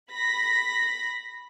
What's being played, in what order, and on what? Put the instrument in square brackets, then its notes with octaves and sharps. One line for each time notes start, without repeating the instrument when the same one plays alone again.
[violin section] B5 A#6 B6